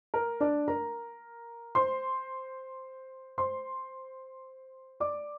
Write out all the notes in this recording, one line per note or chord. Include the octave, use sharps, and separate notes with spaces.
A#4
D4 D5
A#4 A#5
C5 C6
C5 C6
D5 D6